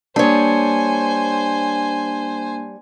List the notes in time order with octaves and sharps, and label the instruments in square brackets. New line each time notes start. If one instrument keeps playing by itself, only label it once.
[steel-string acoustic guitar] G3 C#5 [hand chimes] A#3 D4 A5 [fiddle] C5 G#5